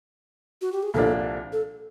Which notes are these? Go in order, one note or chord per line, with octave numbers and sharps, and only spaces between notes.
F#4
G4
G#4
C2 A#2 F3 A#3 D4 A4
A4